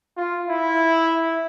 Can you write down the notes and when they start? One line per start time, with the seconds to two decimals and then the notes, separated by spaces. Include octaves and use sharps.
0.17 F4
0.49 E4